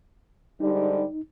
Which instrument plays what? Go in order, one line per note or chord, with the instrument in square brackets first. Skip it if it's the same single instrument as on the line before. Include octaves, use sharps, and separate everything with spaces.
[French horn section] G#2 D3 G3 [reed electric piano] D#4